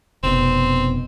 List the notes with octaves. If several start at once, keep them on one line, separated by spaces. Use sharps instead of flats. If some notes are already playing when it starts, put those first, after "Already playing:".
F1 B2 C4